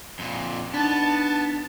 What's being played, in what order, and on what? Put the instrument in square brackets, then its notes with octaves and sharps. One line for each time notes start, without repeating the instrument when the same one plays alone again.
[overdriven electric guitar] F2 A#2
[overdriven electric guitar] B3 [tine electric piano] D4 D#4 [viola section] A5